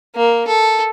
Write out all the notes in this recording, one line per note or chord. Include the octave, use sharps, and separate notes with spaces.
A#3
A4